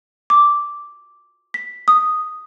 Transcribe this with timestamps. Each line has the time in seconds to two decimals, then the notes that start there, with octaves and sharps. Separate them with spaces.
0.30 D6
1.54 B6
1.88 D#6